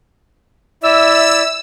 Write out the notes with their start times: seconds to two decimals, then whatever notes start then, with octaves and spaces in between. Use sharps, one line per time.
0.83 E4 D5 E5 E6